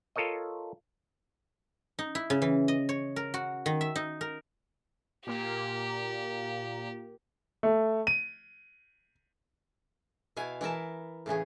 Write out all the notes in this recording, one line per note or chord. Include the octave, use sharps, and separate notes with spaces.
F4 A4 A#4 C#5 D#5
D#4
E4
C#3
E3
D#5
C#5
A#4
F#4
D#3
E5
D#4
A#4
A#2 A#3 G4
A3
D#7
B2 E4 F5 G#5
E3 E4 A#4 A5
A2 C#3 E3 G#4